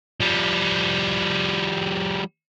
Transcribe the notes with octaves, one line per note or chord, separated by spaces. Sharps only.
F3 G3